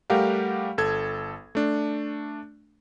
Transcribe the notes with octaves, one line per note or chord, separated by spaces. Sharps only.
G3 A3 G4 A#4 F5 F#5
G1 A4 G#6
A3 D4